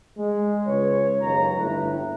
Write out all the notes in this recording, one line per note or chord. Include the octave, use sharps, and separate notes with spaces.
G#3
C#2 B4 C#5
F#1 D#2 A#5
G1 A2 A3 B4